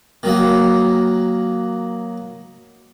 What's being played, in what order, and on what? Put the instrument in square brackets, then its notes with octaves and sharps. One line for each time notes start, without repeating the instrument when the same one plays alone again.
[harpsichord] D#3 F#3 A#3